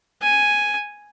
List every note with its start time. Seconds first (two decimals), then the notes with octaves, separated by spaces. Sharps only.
0.22 G#5